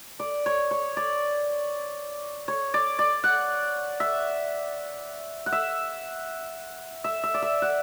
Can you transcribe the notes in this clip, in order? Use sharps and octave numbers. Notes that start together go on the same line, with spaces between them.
D5
C#5
C#5
D5
C#5
D5
D5
F#5
E5
F#5
E5
E5
E5
D5
E5
F#5